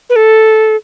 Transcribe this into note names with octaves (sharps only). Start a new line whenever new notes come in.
B4
A4